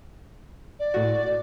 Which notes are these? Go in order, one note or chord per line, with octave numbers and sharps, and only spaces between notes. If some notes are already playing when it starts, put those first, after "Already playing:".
D5
A2 F#4